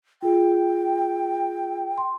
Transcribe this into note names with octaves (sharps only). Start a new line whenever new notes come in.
F4 G#4 G5
C6